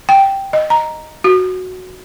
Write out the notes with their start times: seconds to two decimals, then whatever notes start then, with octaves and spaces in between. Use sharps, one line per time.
0.09 G5
0.53 D#5
0.70 A#5
1.24 F#4